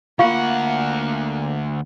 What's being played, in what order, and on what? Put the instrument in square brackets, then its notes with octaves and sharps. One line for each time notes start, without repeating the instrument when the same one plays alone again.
[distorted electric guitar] D2 F#5 [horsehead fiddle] A#3 [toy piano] F4 F5 C#6